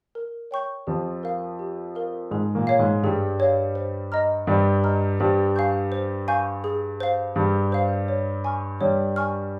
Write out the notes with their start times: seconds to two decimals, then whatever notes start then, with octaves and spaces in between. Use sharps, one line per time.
0.15 A#4
0.51 C#5 G5 C#6 G6
0.87 F2 F3 G4
1.23 A#4 F5
1.59 G4
1.95 A#4 F5
2.31 G#2 G#3 G#4
2.55 A#2 A#3
2.67 C#5 F5
2.79 G#2 G#3
3.03 G2 G3 G#4
3.40 C#5 F5
3.75 C5
4.12 D#5 A#5 F6
4.47 G2 G3 C5
4.84 D#5 A#5 F6
5.20 G2 G3 C5
5.56 F5 G#5 C#6 G6
5.92 C5
6.28 F5 G#5 C#6 G6
6.64 G#4
7.00 C5 F5
7.36 G2 G3 G#4
7.72 C5 F5
8.08 C#5
8.45 G#5 C#6 F6
8.81 G2 G3 C#5
9.16 G#5 C#6 F6